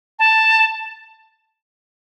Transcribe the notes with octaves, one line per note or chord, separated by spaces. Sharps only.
A5